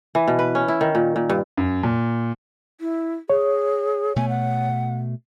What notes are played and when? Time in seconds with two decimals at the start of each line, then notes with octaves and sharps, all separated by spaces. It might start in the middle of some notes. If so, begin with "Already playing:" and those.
0.15 E3
0.28 B2
0.39 B4
0.55 C#4
0.68 E4
0.81 D#3
0.95 A#2
1.16 A#2
1.30 G2
1.57 F#2
1.83 A#2
2.80 E4
3.30 G#4 C#5
4.16 B2 A3 G#5
4.29 F#5